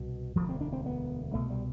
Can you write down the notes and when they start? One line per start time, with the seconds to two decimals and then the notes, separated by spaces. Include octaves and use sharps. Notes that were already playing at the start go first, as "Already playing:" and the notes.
Already playing: C2 B2
0.36 E1 D2 D3 F3
0.49 C4
0.61 D4
0.72 C4
0.86 B3
1.34 C2 B2 A3
1.50 G3